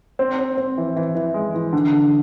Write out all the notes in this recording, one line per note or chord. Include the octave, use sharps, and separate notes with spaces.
C4
C4
C4
E3
E3
E3
G#3
E3
D3
D3